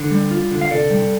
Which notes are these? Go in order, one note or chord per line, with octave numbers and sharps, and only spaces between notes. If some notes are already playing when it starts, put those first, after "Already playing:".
Already playing: D3
G3
F4
D3
F5
C3 A4 D5
G3